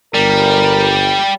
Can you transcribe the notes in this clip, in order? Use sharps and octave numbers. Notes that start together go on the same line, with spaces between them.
G1 G3 A#4